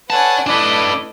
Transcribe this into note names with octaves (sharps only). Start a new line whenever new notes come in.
A4 B4 C#5 D5 F#5 G#5 A5
A3 D4 E4 B4 D#5 A5 D6